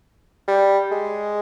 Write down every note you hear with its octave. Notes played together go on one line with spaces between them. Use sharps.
G3
G#3